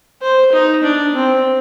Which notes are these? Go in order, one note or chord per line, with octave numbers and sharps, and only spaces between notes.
C5
D#4
D4
C4